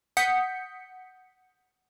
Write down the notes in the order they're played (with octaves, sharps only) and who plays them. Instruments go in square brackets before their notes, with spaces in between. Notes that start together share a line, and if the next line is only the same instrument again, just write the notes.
[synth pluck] F#5 D#6 G6 B6 C#7